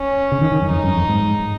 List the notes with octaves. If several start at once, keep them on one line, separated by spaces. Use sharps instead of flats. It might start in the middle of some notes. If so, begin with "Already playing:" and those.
Already playing: C#4
C#3
D#3
D#3
F#2
F2 D#4
F#2
F2
G#2